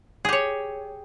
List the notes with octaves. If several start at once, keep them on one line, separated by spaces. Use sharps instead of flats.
G4 G#4 C#5